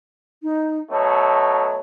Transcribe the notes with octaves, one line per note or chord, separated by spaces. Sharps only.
D#4
B2 F#3 A3 C#5